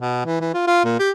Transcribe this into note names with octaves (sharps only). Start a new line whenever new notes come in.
B2
E3
E3
F4
F4
A#2
G4